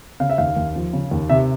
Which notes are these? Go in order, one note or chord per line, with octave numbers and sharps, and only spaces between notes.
C#3 F5
E5
D#2 F5
D#2
F3
C#3
D#2
C3 E5